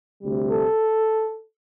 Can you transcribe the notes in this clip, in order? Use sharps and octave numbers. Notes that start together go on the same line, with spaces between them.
D2 C3 G3
A4